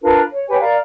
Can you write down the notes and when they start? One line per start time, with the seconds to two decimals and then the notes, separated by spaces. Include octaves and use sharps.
0.01 D4 F4 A#4 B4
0.31 C#5
0.48 G4 B4 C#5 G#5
0.60 A#4 D5 F5 A#5